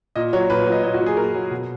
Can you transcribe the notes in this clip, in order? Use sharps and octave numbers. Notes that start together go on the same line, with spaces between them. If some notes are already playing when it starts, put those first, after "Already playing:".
A#2 D#5
F#3 C#5
A#2 B4
F#3
D#5
A#2 D#5
F#4
F#3
G#4
A#2 A#4
F#3
B2